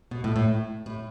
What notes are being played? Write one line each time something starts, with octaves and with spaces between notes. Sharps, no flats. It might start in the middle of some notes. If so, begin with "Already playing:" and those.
B2
A2
A2
A2